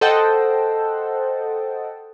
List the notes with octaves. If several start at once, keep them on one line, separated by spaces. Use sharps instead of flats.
A4 C5 D#5 F#5 G5 A5